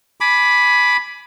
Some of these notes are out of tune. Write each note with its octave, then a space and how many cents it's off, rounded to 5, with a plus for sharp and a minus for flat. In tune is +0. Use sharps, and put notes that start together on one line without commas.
G#5 +20 B5 +0 D6 +5